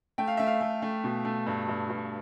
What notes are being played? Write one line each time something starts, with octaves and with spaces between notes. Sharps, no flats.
A3 G5
F5
A3 E5
F5
A3
A3
B2
A3
G2
G2
G2